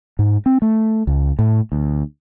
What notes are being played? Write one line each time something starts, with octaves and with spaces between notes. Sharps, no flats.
G#2
C4
A3
C#2
A2
D2